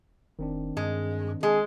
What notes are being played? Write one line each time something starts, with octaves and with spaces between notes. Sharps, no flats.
F1 D#3 C4 D4
G2 G#3
G#3 G#4